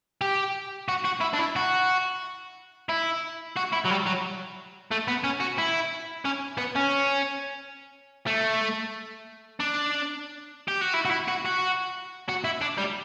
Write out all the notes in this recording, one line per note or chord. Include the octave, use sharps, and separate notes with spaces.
G4
F#4
F#4
E4
D4
E4
F#4
E4
F#4
E4
F#3
G3
F#3
A3
B3
C#4
F#4
E4
C#4
B3
C#4
A3
D4
G4
F#4
E4
F#4
E4
F#4
F#4
F#4
E4
D4
G3